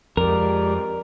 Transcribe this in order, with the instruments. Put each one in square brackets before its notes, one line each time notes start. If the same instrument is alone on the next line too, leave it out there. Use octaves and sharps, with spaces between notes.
[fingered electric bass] F2 [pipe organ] G#3 G4 D5 [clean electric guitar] A#4